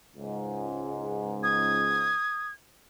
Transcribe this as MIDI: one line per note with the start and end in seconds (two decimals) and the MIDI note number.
0.16 2.14 37
0.16 2.14 44
1.43 2.48 87
1.43 2.53 92